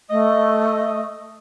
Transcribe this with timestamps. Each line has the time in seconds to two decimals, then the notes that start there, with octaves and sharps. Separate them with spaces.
0.10 A3 D#5